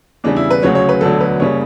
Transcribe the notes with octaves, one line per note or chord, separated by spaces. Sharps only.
E2 C#3 G3 D4
E4
B4
D2 C#3 F#3 C#5
C#5
B4
E1 D2 D3 F#3 A4
B4
F#1 C#3 G3 C#5